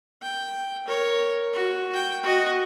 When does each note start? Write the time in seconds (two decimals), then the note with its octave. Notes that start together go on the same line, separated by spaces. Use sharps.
0.22 G5
0.87 A#4 C#5
1.54 F#4
1.93 G5
2.23 F#4 D#5